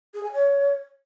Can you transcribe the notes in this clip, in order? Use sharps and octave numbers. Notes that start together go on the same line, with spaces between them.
G#4
G#5
C#5